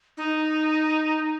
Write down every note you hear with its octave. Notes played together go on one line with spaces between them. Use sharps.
D#4